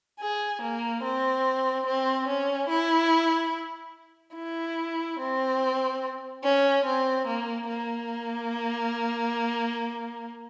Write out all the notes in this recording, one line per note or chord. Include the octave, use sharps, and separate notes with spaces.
G#4
A#3
C4
C4
C#4
E4
E4
C4
C#4
C4
A#3
A#3